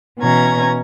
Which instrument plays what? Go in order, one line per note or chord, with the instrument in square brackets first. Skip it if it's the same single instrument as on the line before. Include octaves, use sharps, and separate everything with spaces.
[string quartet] B2 E3 C#4 A#5 G#6